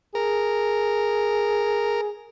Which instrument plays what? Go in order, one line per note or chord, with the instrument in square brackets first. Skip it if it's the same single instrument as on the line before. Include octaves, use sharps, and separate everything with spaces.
[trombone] G#4 [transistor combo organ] A#4